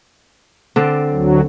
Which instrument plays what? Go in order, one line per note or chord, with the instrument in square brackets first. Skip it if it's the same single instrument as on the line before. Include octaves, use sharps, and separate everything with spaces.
[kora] D3 C4 D5
[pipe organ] D2 F#3